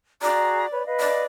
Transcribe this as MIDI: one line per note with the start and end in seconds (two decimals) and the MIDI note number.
0.22 0.66 66
0.22 0.66 68
0.22 0.84 74
0.22 0.66 82
0.72 0.83 71
0.72 0.83 73
0.72 0.83 83
0.87 1.23 71
0.87 1.23 75
0.87 1.23 77
1.00 1.25 74